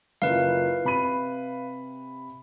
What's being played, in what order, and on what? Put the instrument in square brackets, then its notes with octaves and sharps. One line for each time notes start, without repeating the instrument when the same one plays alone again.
[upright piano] F#1 E4 F4 [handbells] B4 F5
[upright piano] C3 B5 D#7